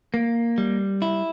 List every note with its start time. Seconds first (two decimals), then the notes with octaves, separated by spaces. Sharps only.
0.14 A#3
0.58 G3
1.02 E4